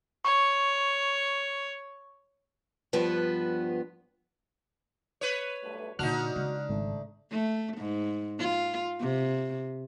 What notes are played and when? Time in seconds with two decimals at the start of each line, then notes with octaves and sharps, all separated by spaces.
0.25 C#5 C#6
2.93 G2 F3 B3 B4
5.21 B4 C#5
5.63 B1 G2 A3
5.99 A#2 D3 D4 D#4 F#4 F6 F#6
6.36 C#3 G#3
6.69 G#1 A3
7.31 A3
7.77 G#2
8.39 F4
9.00 C3